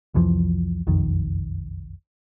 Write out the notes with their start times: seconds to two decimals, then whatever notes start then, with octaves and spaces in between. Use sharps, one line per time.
0.14 C2 F2 E3 F3
0.87 F#1 B1 F2 D#3